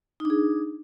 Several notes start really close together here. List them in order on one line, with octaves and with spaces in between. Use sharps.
D#4 D4 G#4